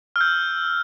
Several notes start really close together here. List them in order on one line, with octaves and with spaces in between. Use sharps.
F6 E6 G6